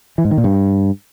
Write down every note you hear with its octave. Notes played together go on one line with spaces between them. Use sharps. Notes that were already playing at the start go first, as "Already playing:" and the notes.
E3
G#2
D#3
A#2
G2